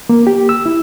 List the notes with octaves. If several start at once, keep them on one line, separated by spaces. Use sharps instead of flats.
A#3
G4
E6
E4